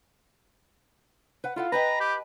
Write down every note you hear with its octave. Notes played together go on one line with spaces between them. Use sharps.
B4 F#5
E4 F4 A4 F#5
B4 D#5 G5 A5 A#5
G4